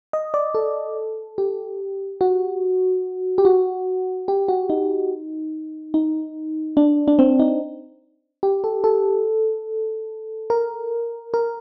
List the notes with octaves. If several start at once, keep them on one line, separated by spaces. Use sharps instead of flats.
D#5
D5
A4
G4
F#4
G4
F#4
G4
F#4
D#4
D#4
D4
D4
C4
D#4
G4
A4
A4
A#4
A#4